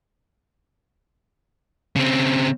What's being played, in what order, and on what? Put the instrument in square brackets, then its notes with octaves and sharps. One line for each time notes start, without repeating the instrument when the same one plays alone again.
[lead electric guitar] C#3 C4